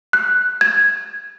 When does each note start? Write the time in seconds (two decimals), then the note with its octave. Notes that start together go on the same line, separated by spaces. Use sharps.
0.13 F#6
0.61 G#6